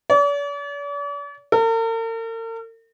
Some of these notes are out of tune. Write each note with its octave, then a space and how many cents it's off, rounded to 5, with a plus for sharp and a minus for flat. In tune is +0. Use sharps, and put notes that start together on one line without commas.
D5 -45
A#4 -45